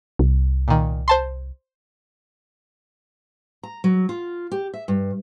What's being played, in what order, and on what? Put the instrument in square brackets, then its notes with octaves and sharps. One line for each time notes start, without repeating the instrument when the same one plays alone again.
[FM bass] C2
[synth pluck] A#2 D#3
C5 A5 C6
[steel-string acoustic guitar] A#5
F#3
F4
G4
E5
G2